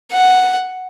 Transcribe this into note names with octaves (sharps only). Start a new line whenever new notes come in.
F#5